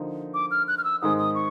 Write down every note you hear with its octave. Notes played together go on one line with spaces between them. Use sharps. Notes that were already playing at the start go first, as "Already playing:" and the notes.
Already playing: D3 F3 A#3 D#4
D6
F6
F#6
F6
E6
G#2 D#3 G#3 C4 D#6
D#6
C#6